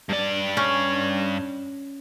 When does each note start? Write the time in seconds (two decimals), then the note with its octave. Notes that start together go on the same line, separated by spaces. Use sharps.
0.09 G2 D5
0.57 C#4